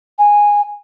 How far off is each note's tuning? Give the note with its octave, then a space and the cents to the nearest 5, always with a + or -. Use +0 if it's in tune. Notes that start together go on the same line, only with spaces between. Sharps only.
G#5 -10